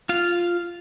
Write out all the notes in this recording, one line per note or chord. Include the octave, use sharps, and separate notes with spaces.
F4 F5